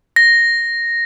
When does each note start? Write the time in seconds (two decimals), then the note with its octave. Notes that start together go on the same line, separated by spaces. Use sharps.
0.16 A#6